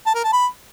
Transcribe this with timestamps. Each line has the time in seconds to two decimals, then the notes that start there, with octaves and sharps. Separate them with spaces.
0.06 A5
0.15 A#4
0.24 A5
0.33 B5